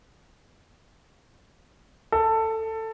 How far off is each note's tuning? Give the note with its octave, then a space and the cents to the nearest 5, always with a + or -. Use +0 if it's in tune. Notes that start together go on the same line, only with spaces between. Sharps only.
A4 +15